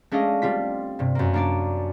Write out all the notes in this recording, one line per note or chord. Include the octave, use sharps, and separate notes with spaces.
G#3 A3 C#4 D4 D#5 F5
G3 C4 F4 B6
G2 C3
F#2 A#3
A#3 D4 D5